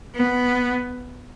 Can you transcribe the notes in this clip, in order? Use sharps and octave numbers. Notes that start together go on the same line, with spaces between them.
B3